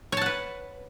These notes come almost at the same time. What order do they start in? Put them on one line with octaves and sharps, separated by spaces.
C#5 A5 F#5 B4